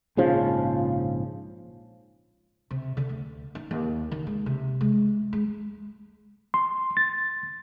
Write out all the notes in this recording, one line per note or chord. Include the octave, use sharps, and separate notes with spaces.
A#1 G#2 C#3 F3
C3
D3
D2
D#4
D#2
D#3
G#3
C3
G#3
G#3
C6
A6